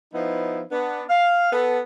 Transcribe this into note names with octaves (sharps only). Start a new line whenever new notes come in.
F3 B3 D#4 E4
B3 D4
F5
B3 A4